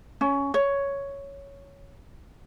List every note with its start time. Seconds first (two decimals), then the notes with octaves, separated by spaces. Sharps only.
0.21 C#4
0.54 C#5